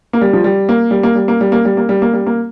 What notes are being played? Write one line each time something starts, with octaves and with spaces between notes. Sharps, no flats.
A#3
G3
F3
G3
A#3
G3
A#3
G3
A#3
G3
A#3
G3
A#3
G3
A#3
G3
A#3